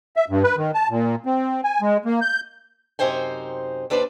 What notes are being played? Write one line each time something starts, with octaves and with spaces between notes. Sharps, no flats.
E5
G2
B4
D#3
A5
A#2
C4
G#5
G#3
A#3
G6
F#2 C3 D#4 C5 G5 G#5
D#2 D4 B4 C5 D5